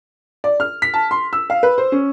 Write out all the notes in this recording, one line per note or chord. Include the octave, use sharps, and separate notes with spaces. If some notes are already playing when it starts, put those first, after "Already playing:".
D5
F6
B6
A5
C6
E6
F5
B4
C5
C#4